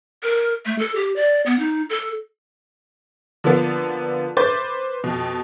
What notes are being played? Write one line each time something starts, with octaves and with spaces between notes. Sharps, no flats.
A#4
A3
A4
G4
D5
B3
D#4
A4
D3 F3 A#3 B3
B4 C5 D6 G6 A6
F2 B2